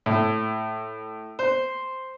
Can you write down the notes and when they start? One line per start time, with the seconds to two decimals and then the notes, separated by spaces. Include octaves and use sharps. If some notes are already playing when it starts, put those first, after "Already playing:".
0.06 A2
1.39 C5